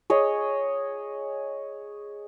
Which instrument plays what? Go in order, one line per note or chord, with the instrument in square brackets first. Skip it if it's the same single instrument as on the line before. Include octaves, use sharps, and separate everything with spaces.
[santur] G#4 C#5 D#5